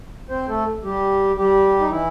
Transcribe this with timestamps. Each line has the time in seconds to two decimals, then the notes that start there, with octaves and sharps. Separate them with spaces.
0.30 C4 C5
0.48 A3 A4
0.83 G3 G4
1.37 G3 G4
1.80 D#4
1.90 E3 E4